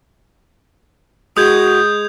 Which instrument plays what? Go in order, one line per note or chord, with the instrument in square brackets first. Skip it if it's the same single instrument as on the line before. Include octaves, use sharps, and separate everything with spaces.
[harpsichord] G#3 [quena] F#4 [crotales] D#6 G6 G#6